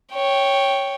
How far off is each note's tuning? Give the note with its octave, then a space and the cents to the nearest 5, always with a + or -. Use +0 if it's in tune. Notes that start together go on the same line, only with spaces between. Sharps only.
C#5 +0 G5 +0